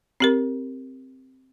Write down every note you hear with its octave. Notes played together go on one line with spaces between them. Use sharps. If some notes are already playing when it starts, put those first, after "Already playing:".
C4 G4 A#4